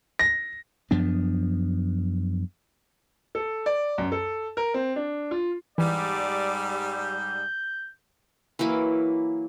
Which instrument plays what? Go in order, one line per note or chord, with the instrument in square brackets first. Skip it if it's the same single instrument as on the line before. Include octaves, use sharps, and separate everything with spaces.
[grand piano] A#6
[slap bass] F#2 F3 B3 D4
[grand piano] A4
D5
F#2
A4
A#4
C4
D4
F4
[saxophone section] G#2 G3 [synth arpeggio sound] E3 [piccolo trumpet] D5
[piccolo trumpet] G6
[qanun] E3 F#3 A#3 E4